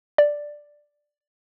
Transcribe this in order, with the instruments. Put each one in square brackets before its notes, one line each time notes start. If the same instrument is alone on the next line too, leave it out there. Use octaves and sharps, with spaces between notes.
[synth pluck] D5